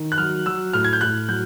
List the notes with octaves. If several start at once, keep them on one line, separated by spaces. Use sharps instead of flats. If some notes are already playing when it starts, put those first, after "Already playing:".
Already playing: D#3
F#6
F#3 F6
F#3 E6
A2 F6
G#6
G6
A2 F#6
F#3 G6